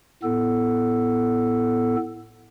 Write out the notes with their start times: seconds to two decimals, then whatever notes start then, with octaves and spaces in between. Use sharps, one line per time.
0.23 A2 B3 A4